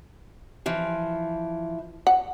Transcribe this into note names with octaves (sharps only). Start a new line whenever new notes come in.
E3 F3
F#5